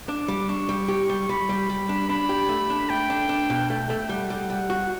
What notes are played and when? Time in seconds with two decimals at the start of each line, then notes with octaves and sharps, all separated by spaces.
0.08 D4 D6
0.28 G3
0.49 D4 C#6
0.69 G3
0.88 G4
1.10 G3
1.29 G3 B5
1.49 G3
1.70 G3
1.89 D4
2.09 D4 B5
2.29 G4
2.49 A3
2.70 D4
2.89 A3 G5
3.10 D4
3.29 D4
3.50 B2
3.70 A3 G5
3.90 A3
4.09 G3 F#5
4.30 G3
4.50 G3 F#5
4.70 F#4